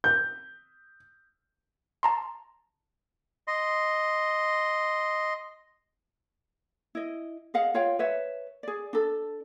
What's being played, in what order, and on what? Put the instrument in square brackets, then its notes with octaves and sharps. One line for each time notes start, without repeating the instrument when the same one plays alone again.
[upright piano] G6
[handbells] A5 A#5 C6
[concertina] D#5 C6
[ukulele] E4 D#5
G#4 D#5 F5 F#5
F4 C#5 F5 G5
B4 C#5 E5
G#4 D5
D4 A4